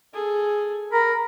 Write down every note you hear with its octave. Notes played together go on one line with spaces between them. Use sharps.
G#4 A4
A#4 B5